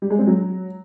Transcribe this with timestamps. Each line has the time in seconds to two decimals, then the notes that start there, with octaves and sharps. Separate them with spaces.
0.02 G3
0.10 G#3
0.19 C4
0.27 F#3